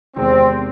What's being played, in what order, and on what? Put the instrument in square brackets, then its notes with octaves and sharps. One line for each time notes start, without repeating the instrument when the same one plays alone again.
[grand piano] E2 C3 D#3 G#3 [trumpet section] C4